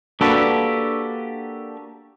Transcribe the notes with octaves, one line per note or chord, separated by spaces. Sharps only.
A#3 D4 F#4 G4 A4 B4